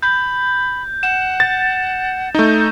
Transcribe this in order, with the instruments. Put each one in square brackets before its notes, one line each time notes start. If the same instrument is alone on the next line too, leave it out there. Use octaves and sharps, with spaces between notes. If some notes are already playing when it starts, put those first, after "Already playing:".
[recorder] B5 [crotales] G6
[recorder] F#5 [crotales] E7
[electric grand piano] A6
[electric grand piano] A3 D#4 [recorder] G6